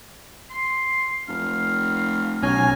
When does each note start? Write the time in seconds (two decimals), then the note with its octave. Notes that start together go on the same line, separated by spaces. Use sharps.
0.50 C6
1.28 F1 F5
2.43 B1 C#4 G#5 A#5